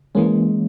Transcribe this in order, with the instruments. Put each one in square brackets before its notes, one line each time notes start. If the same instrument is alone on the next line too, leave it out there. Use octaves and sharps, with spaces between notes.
[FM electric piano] E3 A#3 C#4 [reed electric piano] G#3